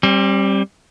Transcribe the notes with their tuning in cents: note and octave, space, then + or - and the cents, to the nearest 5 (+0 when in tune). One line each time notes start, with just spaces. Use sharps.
G3 +0 C4 +40